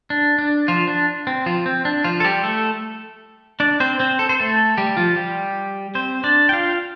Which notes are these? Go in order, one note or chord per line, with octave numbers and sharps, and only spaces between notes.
D4
D4
F3 F4
D4
C4
F3 F4
C4
D4
F3 F4
A4
G3 G4
A3 A4
D4 D5
C4 C5
C4 C5
A4
C5
A3 A4
G3 G4
F3 F4
G3 G4
C4 C5
D4 D5
G5
F4 F5